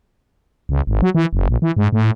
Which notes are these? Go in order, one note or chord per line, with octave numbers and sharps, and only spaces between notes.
C#2
G#1
F#3
E3
F#1
A#1
E3
G#2
A2